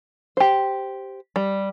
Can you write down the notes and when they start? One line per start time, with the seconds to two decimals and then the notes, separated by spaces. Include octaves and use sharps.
0.37 G4 C5
1.36 G3